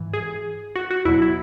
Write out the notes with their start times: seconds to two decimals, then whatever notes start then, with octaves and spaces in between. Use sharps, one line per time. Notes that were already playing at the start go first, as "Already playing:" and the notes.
Already playing: G#2 E3
0.14 G#4
0.75 F#4
0.91 F#4
1.05 E2 B2 F#3 E4
1.22 E4